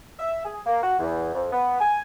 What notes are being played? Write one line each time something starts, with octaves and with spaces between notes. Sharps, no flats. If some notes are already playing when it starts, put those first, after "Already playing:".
E5
G#4
A#3
F#4
E2
F2
B3
G#5